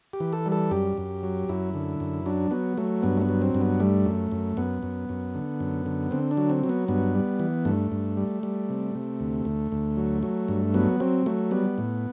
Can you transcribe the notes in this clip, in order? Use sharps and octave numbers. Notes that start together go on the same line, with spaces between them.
G4
E3
A4
G3
A4
F#2 G4
F#2
F#3
F#2 E4
D3
F#2
F#3 D4
F#3 B3
F#3 A3
G2 B3
A3
B3
F#3
C4
G2
B3
G3 A3
F#2
F#2
F#2 B3
F#2
F#2
D3
F#2
D3
D3 C4
D4
F#3
C4
F#3
B3
G2 B3
G3
E3
G2 A3
G2
G3
G3
C3
C3
D2
D2
D2
F#3
F#3
G2
F#3 B3
F#3 C4
F#3 A3
G3 B3
A2